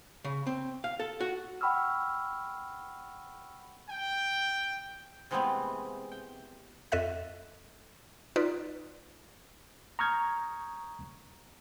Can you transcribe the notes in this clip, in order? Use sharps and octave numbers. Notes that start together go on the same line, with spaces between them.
C#3
C4
F5
A4
F#4
F#5 G5 B5 C#6 E6 F6
G5
C3 E3 G#3 A3 B3 C4
G5
F2 A4 D#5 E5 F#6
D#4 F4 B4 D5
A#5 C#6 D#6 F6 G6 G#6